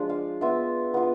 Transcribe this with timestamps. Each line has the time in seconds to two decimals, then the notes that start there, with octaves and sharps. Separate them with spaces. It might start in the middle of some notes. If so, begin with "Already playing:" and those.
Already playing: F3 G#3 D4 F4
0.09 F5
0.41 B3 F4 E5
0.94 B3 F4